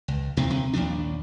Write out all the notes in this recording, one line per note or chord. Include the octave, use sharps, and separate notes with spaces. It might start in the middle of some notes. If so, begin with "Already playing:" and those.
C#2
D#2 C3 C4
C3
A#1 D#2 F3 D4